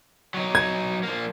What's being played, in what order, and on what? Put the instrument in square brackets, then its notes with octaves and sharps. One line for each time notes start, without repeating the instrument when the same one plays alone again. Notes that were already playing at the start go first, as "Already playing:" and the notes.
[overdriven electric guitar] F#3 D#4
[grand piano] G#6
[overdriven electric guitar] F3 A#3